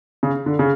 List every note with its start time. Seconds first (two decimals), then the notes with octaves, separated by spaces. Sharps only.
0.23 C#3
0.46 D3
0.59 C#3